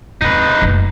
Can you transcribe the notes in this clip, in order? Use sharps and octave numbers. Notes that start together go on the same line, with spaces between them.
D#2 C3 D#4 B4
F#1 C#3